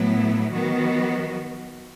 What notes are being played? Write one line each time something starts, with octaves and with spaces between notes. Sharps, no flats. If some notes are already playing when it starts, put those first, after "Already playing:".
Already playing: A2 F#3 B3 E4
D#3 F#3 B3 F#4